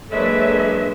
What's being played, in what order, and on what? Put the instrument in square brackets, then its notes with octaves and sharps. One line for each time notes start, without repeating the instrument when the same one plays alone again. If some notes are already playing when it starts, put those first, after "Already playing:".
[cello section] F#3 D4 E5 [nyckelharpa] G#3 B4 [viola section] A#3 A4 C#5